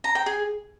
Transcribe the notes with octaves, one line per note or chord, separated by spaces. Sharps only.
A#5
G5
G#4